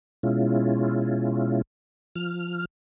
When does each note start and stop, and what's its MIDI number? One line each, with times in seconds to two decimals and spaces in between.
0.23 1.62 47
0.23 1.62 56
0.23 1.62 61
0.23 1.62 64
0.23 1.62 65
2.16 2.65 53
2.16 2.65 89